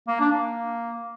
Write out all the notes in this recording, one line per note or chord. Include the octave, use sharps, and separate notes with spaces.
A#3
D4
A#3